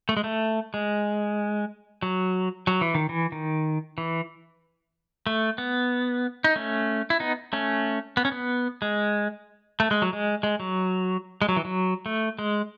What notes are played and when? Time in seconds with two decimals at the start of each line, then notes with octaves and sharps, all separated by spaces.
0.09 A3
0.17 G#3
0.24 A3
0.74 G#3
2.02 F#3
2.67 F#3
2.81 E3
2.95 D#3
3.09 E3
3.32 D#3
3.98 E3
5.27 A3
5.58 B3
6.44 D#4
6.56 A3 C#4
7.10 E4
7.20 B3 D#4
7.53 A3 C#4
8.17 B3
8.25 C#4
8.32 B3
8.82 G#3
9.80 A3
9.91 G#3
10.02 F#3
10.13 G#3
10.43 G#3
10.60 F#3
11.42 G#3
11.49 F#3
11.56 E3
11.65 F#3
12.06 A3
12.39 G#3